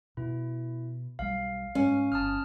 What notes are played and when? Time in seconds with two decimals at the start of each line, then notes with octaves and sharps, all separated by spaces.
0.17 B2 E4
1.19 B1 G3 F5
1.75 G#2 C#4
2.12 G1 A5 D#6 F6